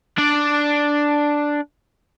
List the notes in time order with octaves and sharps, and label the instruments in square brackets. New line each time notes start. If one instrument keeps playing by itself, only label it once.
[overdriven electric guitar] D4 D5